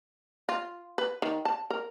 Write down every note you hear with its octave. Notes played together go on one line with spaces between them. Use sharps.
F4
B4
D#3
A5
A#4